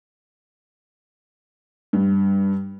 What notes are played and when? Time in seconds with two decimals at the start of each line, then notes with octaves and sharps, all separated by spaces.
1.93 G2